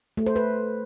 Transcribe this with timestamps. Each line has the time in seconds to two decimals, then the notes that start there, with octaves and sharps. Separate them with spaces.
0.17 A3
0.27 C5
0.36 B4